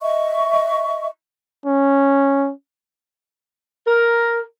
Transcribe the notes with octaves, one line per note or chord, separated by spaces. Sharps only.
D#5 E5 C#6
C#4
A#4